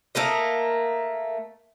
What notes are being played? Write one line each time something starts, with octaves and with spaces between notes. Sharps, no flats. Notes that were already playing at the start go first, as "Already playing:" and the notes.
A3 A#3 A#4 D#5